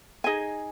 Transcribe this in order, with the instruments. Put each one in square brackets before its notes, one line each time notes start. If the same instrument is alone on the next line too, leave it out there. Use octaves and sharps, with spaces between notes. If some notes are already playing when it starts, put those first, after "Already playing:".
[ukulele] D#4 G#4 D#5 G#5